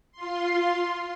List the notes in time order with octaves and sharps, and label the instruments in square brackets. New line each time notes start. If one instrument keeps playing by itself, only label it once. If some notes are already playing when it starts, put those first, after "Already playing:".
[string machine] F4 C6